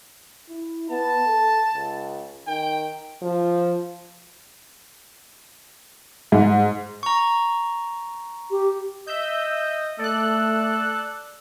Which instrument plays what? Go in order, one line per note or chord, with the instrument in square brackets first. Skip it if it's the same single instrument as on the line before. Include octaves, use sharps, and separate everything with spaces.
[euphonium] E4
[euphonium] B3 [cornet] A5
[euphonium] A4
C#2
[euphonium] D#3 [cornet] G5
[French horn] F3
[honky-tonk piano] G#2
[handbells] A#5 C#6
[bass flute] G4
[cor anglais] D#5 [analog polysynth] E5 E6 G6
[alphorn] A3 [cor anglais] A4 [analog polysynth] D5 F#6